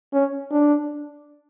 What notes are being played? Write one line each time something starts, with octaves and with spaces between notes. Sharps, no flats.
C#4
D4